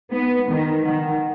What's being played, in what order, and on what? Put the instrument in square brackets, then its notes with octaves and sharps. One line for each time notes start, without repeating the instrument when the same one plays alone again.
[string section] B3 [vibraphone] D#4
[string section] D#3 [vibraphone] D#4
[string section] D#3 [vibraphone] F#5